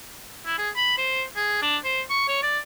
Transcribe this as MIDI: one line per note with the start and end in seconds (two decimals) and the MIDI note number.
0.46 0.56 64
0.58 0.70 68
0.76 0.97 83
0.98 1.23 72
1.36 1.58 68
1.62 1.77 62
1.84 2.01 72
2.10 2.26 85
2.28 2.43 73
2.43 2.59 74